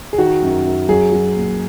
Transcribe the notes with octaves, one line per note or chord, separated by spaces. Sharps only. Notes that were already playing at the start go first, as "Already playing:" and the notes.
G#4
D#3 F#4
F#2
F#2
F#3 G#4
F#3
A#2